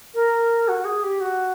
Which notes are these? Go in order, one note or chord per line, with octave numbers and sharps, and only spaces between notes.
A#4
F#4
G#4
G4
F#4